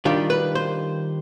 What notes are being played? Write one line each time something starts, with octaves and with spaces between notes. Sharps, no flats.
D#3 G3 D4 F4 G4
B4
C5